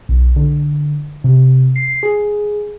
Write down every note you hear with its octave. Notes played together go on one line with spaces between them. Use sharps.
B1
D3
C3
C7
G#4